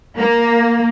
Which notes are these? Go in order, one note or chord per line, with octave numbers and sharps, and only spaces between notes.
A#3